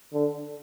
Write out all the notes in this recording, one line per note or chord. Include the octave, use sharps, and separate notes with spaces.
D3